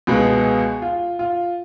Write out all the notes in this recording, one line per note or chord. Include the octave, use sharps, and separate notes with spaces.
C#2 B2 G#3 B3 G#4
G#4
F4
F4